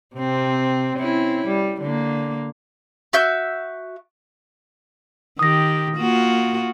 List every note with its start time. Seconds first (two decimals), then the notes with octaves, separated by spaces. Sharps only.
0.15 C3 C4
0.97 C4 C#4 E4
1.47 G3
1.81 D3 A#3
3.13 F#4 E5 G6
5.39 D#3 G4 D#6 A#6
5.97 A#3 F4 F#4